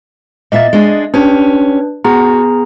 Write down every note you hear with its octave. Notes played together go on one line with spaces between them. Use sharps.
A#2 A#3 D#5 E5 A6
G#3 D4 G#4
C#4 D4 G4 B4
B3 F#4 G#4 A#5